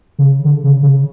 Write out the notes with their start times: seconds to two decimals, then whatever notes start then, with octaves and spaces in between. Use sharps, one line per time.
0.19 C#3
0.45 D3
0.64 C#3
0.83 C#3